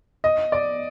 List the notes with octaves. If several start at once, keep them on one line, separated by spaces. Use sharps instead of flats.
D#5
D5